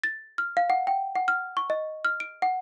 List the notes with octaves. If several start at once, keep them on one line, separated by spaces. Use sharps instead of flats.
A6
F6
F5
F#5
G5
F#5
F6
C#6
D#5
F6
D7
F#5